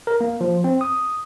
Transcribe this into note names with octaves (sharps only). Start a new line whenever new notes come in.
A#4
A#3
F3
C4
D#6